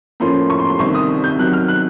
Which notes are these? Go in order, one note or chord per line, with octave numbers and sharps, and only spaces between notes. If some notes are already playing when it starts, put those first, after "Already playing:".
A2 F3 A#3 C#4 C6
C#6
C6
C6
C2 C3 D#3 C#6
D#6
G6
C3 D#3 F#3 F#6
F6
F#6